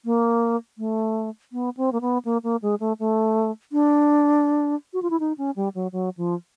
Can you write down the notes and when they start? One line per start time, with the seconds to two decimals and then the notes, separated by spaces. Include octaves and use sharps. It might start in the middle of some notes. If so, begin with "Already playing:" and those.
0.05 A#3
0.78 A3
1.52 B3
1.77 C4
1.92 A#3
2.01 B3
2.25 A#3
2.43 A#3
2.62 G#3
2.80 A3
2.99 A3
3.72 D4
4.93 F#4
5.02 F4
5.10 E4
5.20 D#4
5.38 C#4
5.56 G3
5.75 F#3
5.92 F#3
6.17 F3